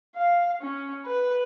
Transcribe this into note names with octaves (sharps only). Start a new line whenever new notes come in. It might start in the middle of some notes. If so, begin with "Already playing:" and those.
F5
C#4
B4